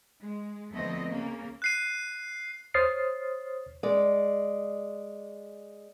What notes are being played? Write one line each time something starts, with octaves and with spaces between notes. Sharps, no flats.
G#3
D2 F3 A3 B3 C4 D#5
C#3 A#3
F#6 C7 D#7
C5 C#5 D#6 F6 A6 C7
G#3 D5